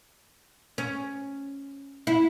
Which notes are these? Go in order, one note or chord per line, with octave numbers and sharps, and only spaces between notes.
C#4
E4